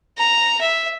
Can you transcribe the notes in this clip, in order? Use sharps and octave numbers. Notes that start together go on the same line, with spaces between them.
A#5
E5